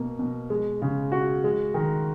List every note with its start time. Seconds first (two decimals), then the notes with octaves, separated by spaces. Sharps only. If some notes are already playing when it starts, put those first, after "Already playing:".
Already playing: B2 A#3
0.19 B2
0.50 G#3
0.82 C#3
1.12 F#4
1.44 G#3
1.74 D#3